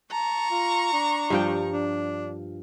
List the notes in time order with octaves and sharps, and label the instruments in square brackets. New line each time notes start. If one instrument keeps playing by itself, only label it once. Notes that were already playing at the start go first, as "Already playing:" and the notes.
[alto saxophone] A5 [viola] A#5 C#6
[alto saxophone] F4
D4
[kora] G2 F3 G5
[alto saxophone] D4